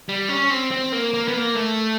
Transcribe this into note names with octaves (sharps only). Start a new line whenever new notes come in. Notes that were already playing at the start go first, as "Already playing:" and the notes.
G3
C#4
C4
C4
A#3
A#3
B3
A#3
A3